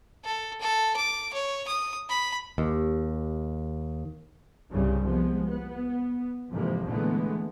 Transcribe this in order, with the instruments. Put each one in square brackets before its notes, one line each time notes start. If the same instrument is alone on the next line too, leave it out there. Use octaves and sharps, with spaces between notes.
[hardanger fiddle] A4
A4
D6
C#5
D#6
B5
[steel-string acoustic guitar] D#2
[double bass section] C2 G2 C#3 G3
F3 G#3 B3
B3
F2 G#2 C3 E3 F3 A#3
A#2 D3 E3 G#3 A3 B3